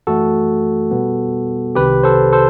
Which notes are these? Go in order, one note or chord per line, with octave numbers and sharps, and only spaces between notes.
F#2 E3 A3 F#4 A4
B2 G3 B3
C2 C3 D#3 G4 B4
A4 C5
A4 C5